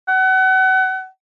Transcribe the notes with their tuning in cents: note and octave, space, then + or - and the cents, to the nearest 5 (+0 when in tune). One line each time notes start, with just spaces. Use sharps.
F#5 +30